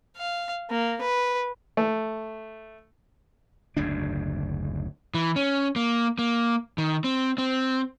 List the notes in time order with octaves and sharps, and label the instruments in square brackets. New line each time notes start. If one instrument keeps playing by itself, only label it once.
[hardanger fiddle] F5
A#3
B4
[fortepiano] A3
[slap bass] F#1 D2 G#2 D4
[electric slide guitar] E3
C#4
A#3
A#3
D#3
C4
C4